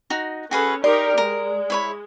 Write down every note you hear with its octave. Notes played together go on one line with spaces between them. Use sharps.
D#4 F#4
C#4 F#4 G#4 A4 B4
D#4 G4 A#4 D5 C6
G#3 A#4
E4 C#5 B5